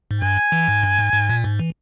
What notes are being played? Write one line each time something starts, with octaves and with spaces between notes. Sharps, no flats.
G#2
G2 G#5
E3
G#2
G2
G#2
G#2
A#2
G#2
E3